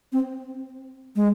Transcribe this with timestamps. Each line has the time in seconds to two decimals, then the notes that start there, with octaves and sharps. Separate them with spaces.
0.13 C4
1.16 G#3